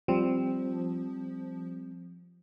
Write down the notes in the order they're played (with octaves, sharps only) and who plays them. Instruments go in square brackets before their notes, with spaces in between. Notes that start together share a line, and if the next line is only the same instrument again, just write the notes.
[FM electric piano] F3 [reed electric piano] G3 C4